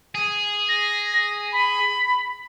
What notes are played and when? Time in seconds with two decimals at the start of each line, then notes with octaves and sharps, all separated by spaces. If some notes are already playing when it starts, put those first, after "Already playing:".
0.15 G#4
0.69 A#6
1.53 B5